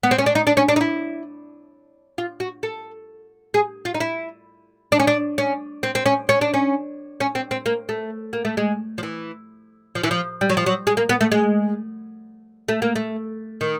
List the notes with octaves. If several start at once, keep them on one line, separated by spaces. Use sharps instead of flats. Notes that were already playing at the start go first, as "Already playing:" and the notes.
B3
C4
C#4
D4
D#4
D4
C#4
D4
D#4
E4
F4
F#4
A4
G#4
F4
D#4
E4
D4
C#4
D4
C#4
C4
C4
C#4
C#4
D4
C#4
C#4
C4
C4
A#3
A3
A#3
A3
G#3
F3
E3
F3
E3
F3
G3
F#3
F3
F#3
G#3
A#3
B3
A3
G#3
A3
A#3
A3
D#3